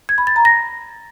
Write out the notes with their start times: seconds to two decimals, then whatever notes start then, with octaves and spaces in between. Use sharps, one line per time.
0.09 G#6
0.18 B5
0.27 A6
0.36 A#5
0.45 A#6